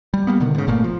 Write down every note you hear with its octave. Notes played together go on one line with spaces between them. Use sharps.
G3
G3 A#3 B3
B2 D3 D#3
G#2 C#3
G1 A#2 A3 A#3
F3